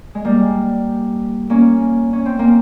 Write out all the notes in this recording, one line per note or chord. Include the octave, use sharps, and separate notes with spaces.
G#3
G3 A#3
A#3 C#4
C#4
C4
A#3